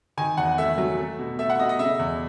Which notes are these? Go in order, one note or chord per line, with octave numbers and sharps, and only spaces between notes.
D#3 G#5
E2 F#5
A3 E5
F#3
A3
B2
A3 E5
F#5
B2 D#5
D#5
C#3 E5
E2